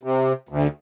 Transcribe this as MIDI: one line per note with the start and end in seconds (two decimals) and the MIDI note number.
0.03 0.33 48
0.49 0.67 38